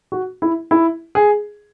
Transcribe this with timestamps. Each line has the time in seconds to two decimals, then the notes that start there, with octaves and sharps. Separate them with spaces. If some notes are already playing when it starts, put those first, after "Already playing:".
0.12 F#4
0.42 E4
0.71 E4
1.15 G#4